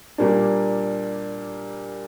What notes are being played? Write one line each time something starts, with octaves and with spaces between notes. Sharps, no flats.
A#2 G3 A#3 D4